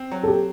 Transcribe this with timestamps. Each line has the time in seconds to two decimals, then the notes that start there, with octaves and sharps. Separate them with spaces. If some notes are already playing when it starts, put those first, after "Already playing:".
Already playing: C4
0.11 F#3
0.24 A4
0.28 G4